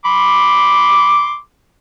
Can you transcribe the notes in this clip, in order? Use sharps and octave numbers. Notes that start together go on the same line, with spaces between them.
B5 C6 D6